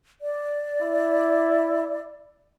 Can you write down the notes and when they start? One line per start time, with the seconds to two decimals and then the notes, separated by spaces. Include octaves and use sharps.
0.21 D5
0.81 E4